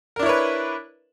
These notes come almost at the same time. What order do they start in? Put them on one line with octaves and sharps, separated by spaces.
A#4 D4 E4 C#5 B4